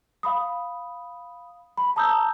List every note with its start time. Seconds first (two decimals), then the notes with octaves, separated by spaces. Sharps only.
0.23 F5 B5 D#6
1.78 B5
1.96 A5 A#5 D#6 E6 G6